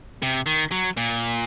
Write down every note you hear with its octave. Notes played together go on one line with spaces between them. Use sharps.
C3
D#3
F#3
A#2